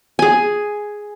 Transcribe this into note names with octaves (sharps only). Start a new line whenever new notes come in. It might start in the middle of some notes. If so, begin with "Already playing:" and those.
G#4 G#5